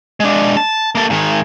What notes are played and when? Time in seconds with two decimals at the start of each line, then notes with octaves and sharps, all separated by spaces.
0.20 G#3 D4
0.57 A5
0.95 A#3 A4
1.10 G#2 D#3